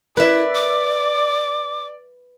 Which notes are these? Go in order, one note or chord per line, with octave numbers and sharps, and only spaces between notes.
E4 B4 D5 E5
D6